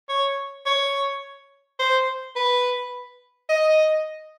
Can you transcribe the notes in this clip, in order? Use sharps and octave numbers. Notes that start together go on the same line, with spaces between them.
C#5
C#5
C5
B4
D#5